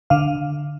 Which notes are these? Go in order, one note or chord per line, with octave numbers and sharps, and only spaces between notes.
D3 F5